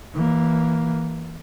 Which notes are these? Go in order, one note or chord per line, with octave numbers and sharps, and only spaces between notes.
E3 A#3